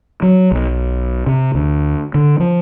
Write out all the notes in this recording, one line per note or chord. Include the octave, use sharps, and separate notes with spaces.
F#3
B1
C3
D2
D3
F3